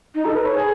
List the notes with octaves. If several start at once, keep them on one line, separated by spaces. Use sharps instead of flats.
D#4
A4
B4
C#5
G#4